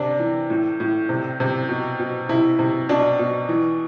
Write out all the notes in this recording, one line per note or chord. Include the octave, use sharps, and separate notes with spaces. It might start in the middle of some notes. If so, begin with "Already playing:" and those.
Already playing: C3 D4
E3
A2
A2
C3
C3
B2
B2
C3 E4
C3
B2 D4
B2
E3